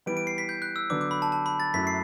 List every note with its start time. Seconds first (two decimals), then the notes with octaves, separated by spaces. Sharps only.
0.06 E3 G3 B3 D7
0.17 D7
0.27 C7
0.38 B6
0.49 G6
0.62 F#6
0.76 E6
0.90 D3 F#3 B3 D4 D6
1.01 D6
1.11 B5
1.22 A5
1.32 A5
1.46 B5
1.60 A6
1.74 F#2 F#3 A3 E4 B6
1.87 C7